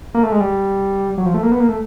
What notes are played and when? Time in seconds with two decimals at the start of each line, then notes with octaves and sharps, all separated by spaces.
0.14 A#3
0.23 A3
0.32 G#3
0.40 G3
1.18 F#3
1.26 F3
1.34 A3
1.43 A#3
1.52 B3
1.60 A#3
1.69 A3